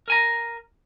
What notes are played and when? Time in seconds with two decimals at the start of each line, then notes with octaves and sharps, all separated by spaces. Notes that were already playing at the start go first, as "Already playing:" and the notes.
0.08 A#4 G#5 A#5